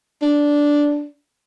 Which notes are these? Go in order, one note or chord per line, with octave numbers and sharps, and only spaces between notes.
D4